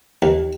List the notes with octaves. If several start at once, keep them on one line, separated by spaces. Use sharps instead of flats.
D#2